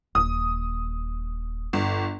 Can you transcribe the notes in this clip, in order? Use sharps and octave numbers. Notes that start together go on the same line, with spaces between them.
D#1 D#6
G1